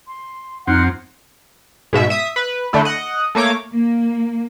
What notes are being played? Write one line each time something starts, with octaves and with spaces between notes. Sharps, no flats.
C6
F2 C4 D#4 F#5 F6
G#2 B2 E5
E5 D#6
B4
D3 A3 E4
D#5 F#5
A3 A#3 C#5 D6
A#3